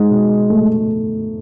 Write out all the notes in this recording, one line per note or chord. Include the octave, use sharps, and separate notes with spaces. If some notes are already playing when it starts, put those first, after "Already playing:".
Already playing: G#3 D#4
B2
A3